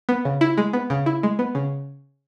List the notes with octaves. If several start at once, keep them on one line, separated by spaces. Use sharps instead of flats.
B3
C#3
E4
G#3
B3
C#3
E4
G#3
B3
C#3